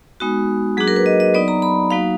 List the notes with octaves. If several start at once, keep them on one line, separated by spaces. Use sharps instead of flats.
G#3 B3 D#4 F#4
F#3 A#3 D4 F#4 G#4
A#4
B4
D#5
D#5
F#3 B3 D#4 D5
A#5
B5
F#3 A#3 D#4 F#4 F5